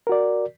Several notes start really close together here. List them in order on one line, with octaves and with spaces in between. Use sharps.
A#4 F#4 D5